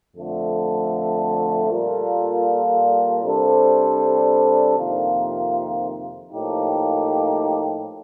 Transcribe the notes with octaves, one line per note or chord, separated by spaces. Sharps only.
F2 D3 F3 A3
A#2 G3 A#3 F4 A4
C3 G3 D4 A4 C5
F2 C3 D#3 A#3 F4
A2 F3 A#3 D#4 G4